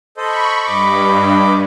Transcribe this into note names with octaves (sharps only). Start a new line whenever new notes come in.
A4 C5 D#5 B5 C#6
G2 D#5 B5 D6